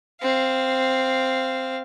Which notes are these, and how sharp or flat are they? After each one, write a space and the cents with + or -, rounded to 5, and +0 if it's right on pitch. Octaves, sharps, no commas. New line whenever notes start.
C4 +0 F5 -5